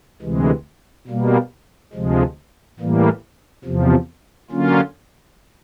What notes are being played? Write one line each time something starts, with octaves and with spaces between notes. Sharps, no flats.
D2 C3 E3 G#3
B2 G3 A#3
D2 C3 F3 G#3
A2 E3 G3 A#3
E2 C3 F3
D3 F#3 A#3 C#4 F4